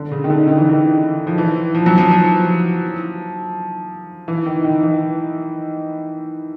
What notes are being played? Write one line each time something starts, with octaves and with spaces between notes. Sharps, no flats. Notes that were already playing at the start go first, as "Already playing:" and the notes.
Already playing: D3
C#3
D#3
D3
D#3
E3
D#3
F3
E3
F3
F#3
F3
F3
E3
D#3
D#3
E3